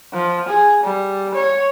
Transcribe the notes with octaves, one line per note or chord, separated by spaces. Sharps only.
F3
G#4
G3
C#5